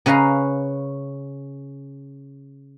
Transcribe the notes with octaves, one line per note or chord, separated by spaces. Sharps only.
C#3 C#4 B4 F5 A#5